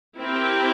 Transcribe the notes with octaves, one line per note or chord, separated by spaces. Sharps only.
C4 E4 G4 A#4